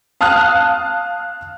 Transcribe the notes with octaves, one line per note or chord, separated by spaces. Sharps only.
F5 A5 D#6 F6 F#6